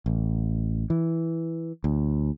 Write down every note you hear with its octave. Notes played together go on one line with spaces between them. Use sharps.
A1
E3
D2